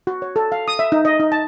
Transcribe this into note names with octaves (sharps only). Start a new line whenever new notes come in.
F#4
C#5
A4
F5
D#6
E5
D#4
D#5
D#4
A5